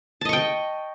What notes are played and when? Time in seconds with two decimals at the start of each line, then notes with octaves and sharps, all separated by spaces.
0.21 A5
0.25 D#5
0.29 C#6
0.33 G5